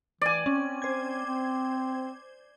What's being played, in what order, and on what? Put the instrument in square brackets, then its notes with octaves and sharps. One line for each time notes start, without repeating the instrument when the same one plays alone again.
[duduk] E3 [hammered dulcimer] D5 G#5
[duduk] C4 [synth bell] C#4
[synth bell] C5 G#6
[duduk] C4